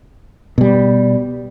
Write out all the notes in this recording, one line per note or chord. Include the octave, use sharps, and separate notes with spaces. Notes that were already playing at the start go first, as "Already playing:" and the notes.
B2 G3